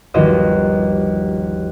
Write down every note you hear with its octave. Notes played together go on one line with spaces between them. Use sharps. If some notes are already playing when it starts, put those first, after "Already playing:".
G1 D#2 D#3 F3 F#4 D#5